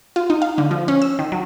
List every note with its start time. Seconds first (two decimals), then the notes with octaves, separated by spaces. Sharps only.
0.16 F4
0.30 D#4
0.42 F5
0.58 D3
0.71 F3
0.88 C#4
1.02 E6
1.19 D#3
1.32 F#3